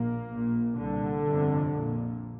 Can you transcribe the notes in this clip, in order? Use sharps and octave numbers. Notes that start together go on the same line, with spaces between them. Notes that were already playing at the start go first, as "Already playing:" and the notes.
Already playing: A#1 A#2 A#3
A#1 A#2
C2 A#2 D3
G1 F2 C3
A#1 A#2